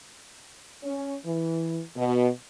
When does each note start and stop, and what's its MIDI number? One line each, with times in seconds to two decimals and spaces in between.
0.82 1.14 61
1.25 1.81 52
1.96 2.28 47